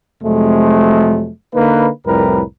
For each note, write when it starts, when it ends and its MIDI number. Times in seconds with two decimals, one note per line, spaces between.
0.23 1.30 41
0.23 1.30 48
0.23 1.30 54
0.23 1.30 56
0.23 1.30 57
1.54 1.88 50
1.54 1.88 58
1.54 1.88 63
1.54 1.88 71
2.06 2.41 36
2.06 2.41 41
2.06 2.41 45
2.06 2.41 55
2.06 2.41 70
2.06 2.41 71